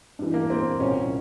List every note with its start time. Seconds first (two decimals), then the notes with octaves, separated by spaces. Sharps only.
0.19 G2 E3
0.34 A#3
0.50 C4
0.80 C2 A#2 C#4